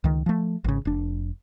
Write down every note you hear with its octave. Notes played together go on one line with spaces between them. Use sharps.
C#2 D#3
F3 A3
G#1 C#3
F1 D4